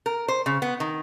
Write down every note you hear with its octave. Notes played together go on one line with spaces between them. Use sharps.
A#4
C5
C#3
B3
D#3